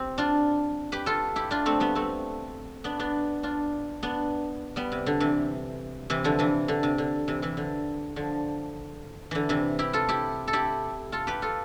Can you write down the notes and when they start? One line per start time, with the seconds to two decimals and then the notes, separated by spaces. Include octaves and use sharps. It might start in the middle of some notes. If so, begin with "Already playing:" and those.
Already playing: C4 G4
0.18 D4 F4
0.92 G4 B4
1.06 F4 A4
1.36 E4 G4
1.51 D4 F4
1.66 A3 C4
1.80 G3 B3
1.95 A3 C4
2.84 B3 D4
2.99 B3 D4
3.43 D4 F4
4.03 B3 D4
4.76 G3 B3
4.92 C3
5.06 D3
5.20 C3 E3
6.10 C3 E3
6.24 D3 F3
6.39 C3 E3
6.68 D3
6.83 C3
6.98 D3
7.28 C3 E3
7.42 C3 E3
7.57 D3
8.16 D3 F3
9.31 D3 E3
9.49 C3 E3
9.79 E4 G4
9.93 F4 A4
10.09 E4 G4
10.48 A4
10.53 E4 G4
11.12 F4 A4
11.27 G4 B4
11.42 F4 A4